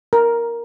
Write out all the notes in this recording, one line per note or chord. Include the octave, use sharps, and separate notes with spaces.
A#4